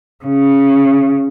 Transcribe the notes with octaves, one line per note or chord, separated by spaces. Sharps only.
C#3